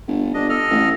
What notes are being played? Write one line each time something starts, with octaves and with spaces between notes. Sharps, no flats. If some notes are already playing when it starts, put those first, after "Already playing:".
G1
G1 D4 D#5
A4 D#5 F6
A1